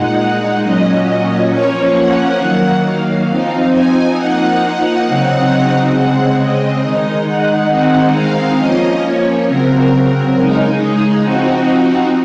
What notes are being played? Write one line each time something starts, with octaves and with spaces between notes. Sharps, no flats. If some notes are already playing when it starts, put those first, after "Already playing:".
Already playing: A#2 G#3 D#4 F#5
A#2 F#3 C#4 D#5
F3 A#3 C#4 C#5
F#5
D#3 F#3 A#3
F5
F3 C4 D#4
G#5
F3 A#3 D#4 F#5
C#3 F#3 C4 D#4
C#3 G#3 C4 F#5
D#5
D#3 G#3 D#4
F#5
D#3 G#3 C4 D#4 F#5
F5
F3 A#3 C#4 D#5
C#5
C#3 F#3 C4 A#4
C#3 G#3 D#4
G#4
F3 C4 D#4 F#4